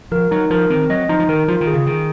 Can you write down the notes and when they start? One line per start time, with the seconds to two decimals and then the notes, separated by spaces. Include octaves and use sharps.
0.11 F3 A#4
0.31 F#3 D#4
0.50 F3 A#4
0.70 D#3 C4
0.90 F#3 D#5
1.09 F3 D#4
1.19 F3
1.28 D#3 A#4
1.48 F3 F4
1.61 D#3
1.67 G#4
1.74 C#3
1.86 D#3 G#4